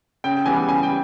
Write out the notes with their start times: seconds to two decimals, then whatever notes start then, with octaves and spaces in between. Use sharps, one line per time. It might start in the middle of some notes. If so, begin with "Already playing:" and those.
0.24 C#3 G5
0.46 E3 G3 B3 G#5
0.68 C#3 G#5
0.83 G5